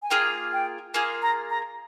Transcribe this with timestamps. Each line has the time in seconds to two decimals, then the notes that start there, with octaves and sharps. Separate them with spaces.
0.03 G#5
0.10 A#3 F4 G#4 G5
0.53 G5
0.94 A#3 F4 G#4 G#5
1.22 A#5
1.50 A#5